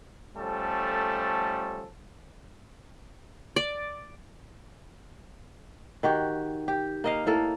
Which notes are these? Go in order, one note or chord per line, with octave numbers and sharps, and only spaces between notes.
F3 G3 A3 C#4 A4
D5
D#3 F#4 G4
G4
A#3 D#5 F5
A2 A#3 A4